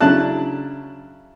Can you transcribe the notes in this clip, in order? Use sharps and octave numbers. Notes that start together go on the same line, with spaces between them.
C#3 F#3 D4 E4 A5 F#6